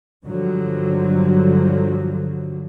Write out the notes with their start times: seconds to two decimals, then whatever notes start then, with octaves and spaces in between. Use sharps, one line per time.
0.24 G2 D3 F3 F#3